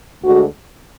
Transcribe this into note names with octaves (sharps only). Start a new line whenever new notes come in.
D2 D3 G#3 F#4